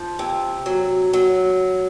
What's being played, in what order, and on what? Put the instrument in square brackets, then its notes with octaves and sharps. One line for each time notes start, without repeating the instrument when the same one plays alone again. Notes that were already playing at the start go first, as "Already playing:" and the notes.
Already playing: [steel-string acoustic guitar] F3
C3
F#3
F#3